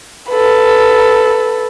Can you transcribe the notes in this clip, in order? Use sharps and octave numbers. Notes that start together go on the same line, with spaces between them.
A4 B4